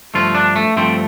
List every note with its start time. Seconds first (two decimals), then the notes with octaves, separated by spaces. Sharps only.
0.14 G2 F3 A3 F4
0.35 D4
0.56 A3
0.77 G2 F3 A3 C4